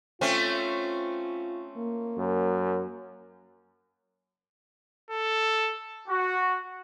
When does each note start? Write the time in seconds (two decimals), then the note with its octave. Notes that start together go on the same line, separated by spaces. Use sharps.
0.21 A3 C4 C#4 F4
1.77 A#3
2.18 F#2
5.11 A4
6.08 F#4